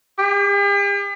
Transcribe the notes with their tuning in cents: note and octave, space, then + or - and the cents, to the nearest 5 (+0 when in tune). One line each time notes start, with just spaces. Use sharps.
G4 +45